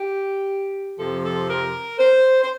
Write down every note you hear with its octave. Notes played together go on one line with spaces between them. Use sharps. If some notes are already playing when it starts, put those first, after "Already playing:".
Already playing: G4
F2 C3 F3 A4
A4
A#4
C5
C5